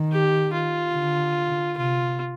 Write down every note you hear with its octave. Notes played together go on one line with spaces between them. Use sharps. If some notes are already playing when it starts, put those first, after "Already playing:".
Already playing: D#3
G4
F4
D3
C3 F4